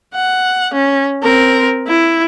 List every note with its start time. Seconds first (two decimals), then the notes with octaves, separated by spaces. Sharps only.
0.15 F#5
0.74 C#4
1.23 C4 A#4
1.88 E4